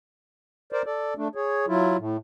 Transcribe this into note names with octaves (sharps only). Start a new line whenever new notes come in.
A#4 C5 D5
A4 D5
A3 D4
G#4 C#5
F#3 E4 F4
A2